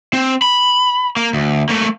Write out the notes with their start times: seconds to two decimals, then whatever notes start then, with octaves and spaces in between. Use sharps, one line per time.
0.13 C4
0.42 B5
1.17 A#3
1.33 D2
1.69 A3 A#3